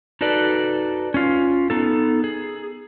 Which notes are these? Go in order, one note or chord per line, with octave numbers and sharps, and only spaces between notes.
D#4 F#4 A4 B4 D5
C#4 F4
B3 D#4 A4
G#4